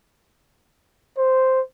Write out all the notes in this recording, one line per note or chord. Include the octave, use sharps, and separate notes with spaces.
C5